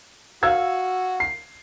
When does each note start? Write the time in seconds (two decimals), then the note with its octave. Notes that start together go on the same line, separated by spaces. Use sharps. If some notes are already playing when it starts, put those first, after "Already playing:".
0.43 F#4 F5 E6 G#6
1.20 C7